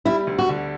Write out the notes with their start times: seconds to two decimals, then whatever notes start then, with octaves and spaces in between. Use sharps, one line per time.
0.05 G3 E4
0.27 D2
0.38 F#4
0.49 D3